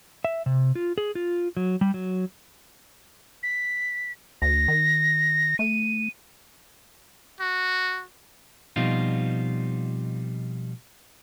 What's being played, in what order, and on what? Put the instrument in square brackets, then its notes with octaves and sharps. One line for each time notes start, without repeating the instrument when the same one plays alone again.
[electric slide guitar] E5
C3
F4
G#4
F4
F#3
G3
F#3
[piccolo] B6
[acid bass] D2 [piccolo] A#6
[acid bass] D#3
[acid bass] A3 [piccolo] D#7
[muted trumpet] F#4
[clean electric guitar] B2 F3 G3 C4 D#4 F4